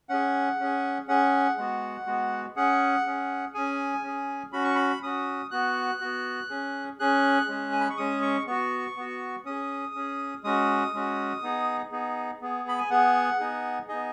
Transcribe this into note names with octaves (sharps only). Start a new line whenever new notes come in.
C#4 G#4 F#5
C#4 G#4
C#4 G#4 F#5
G#3 B3 F#4
G#3 B3 F#4
C#4 G#4 F#5
C#4 G#4
C#4 G#4 G#5
C#4 G#4
C#4 F#4 B5
C#6
B5
C#4 F#4 D#6
B3 F#4 F#6
B3 F#4
C#4 G#4
C#4 G#4 F#6
G#3 C#4 G#4
G#5
B5
C#6
G#3 C#4 G#4 D#6
C#6
B3 F#4 C#6
B3 F#4
C#4 G#4 D#6
C#4 G#4
G#3 C#4 F#4 D#6
G#3 C#4 F#4
B3 D#4 G#4
B3 D#4 G#4
B3 G#4
B5
G#5
B3 G#4 F#5
B3 D#4 G#4
B3 D#4 G#4 D#5